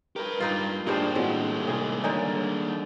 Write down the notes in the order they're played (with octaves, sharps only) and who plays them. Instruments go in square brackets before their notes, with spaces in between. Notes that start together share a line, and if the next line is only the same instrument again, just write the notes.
[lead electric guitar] G4 B4 [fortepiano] A#4
[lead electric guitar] G2 [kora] A#3 D#4 F4
[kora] G2 G#3 C5 [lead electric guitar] G3 A#3 [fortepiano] D4 G5 A5
[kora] A2 G#3 [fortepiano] C4 F#4
[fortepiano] C2 D#4 G#4
[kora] D3 G#3 D#4 [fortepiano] C#5 D5 G#5